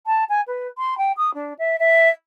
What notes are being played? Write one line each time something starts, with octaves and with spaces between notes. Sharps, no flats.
A5
G#5
B4
C6
G5
D#6
D4
E5
E5